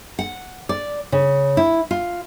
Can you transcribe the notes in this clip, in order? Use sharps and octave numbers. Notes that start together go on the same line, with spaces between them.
F#5
D5
C#3
E4
F4